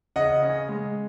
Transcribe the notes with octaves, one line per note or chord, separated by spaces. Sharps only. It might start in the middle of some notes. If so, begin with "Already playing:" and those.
C#3 D#5 F#5
C#4
G#3